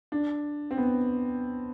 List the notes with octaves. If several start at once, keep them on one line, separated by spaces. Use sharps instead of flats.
D4
C4
B3